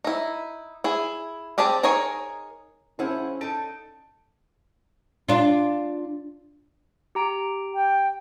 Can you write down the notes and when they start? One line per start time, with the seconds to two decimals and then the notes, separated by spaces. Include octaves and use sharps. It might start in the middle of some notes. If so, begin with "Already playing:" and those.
0.04 D#4 E4
0.84 E4 G#4
1.58 C4 G4 G#4 G5 A5
1.83 D#4 G#4 A#4 C#5 G#5
2.99 F3 C#4 E4 G#4 C5 F#5
3.41 D#4 A4 D7
5.28 D4 F4
7.15 G4 A#5 D7
7.74 G5